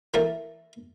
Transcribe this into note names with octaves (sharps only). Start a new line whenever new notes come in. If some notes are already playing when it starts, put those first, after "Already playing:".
E3 A3 A#3 A#4 D5